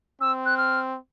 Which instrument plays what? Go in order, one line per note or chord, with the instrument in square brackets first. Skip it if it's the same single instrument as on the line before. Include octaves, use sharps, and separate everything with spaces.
[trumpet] C4 [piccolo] E6
[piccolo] F#6
F6